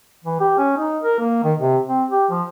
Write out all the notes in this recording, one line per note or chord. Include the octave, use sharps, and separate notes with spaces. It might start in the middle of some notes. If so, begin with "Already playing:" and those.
E3
G4
C#4
D#4
A#4
A#3
D#3
C3
C4
G4
F3